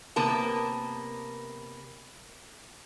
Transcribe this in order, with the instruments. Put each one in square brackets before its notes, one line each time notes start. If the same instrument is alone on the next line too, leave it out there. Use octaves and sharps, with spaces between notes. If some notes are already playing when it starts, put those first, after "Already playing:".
[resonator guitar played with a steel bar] C3 A#3 B3 A#4 A5